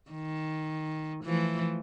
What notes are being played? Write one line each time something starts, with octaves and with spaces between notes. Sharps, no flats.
D#3
E3 F3 A3